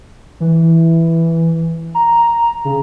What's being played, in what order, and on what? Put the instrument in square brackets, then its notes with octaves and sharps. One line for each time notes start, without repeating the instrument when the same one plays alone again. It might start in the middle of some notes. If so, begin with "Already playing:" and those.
[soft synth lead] E3
A#5
C#3